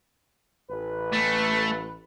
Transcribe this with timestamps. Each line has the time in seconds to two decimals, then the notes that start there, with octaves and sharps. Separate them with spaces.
0.70 A1 B4
1.13 A3